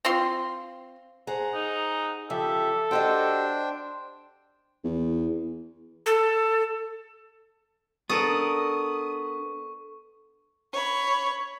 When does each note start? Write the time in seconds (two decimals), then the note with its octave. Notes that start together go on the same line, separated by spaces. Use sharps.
0.05 C4 F4 C6
1.27 G#4 C5 F#5 A#5
1.54 D#4
2.30 C#3 F3 G4 A4 E5
2.91 D4 F#4 G4 C5 D#5 G5
4.84 E2
6.06 A4
8.09 B3 D4 A4 A#4 C#6 D#6
10.73 C#5 B5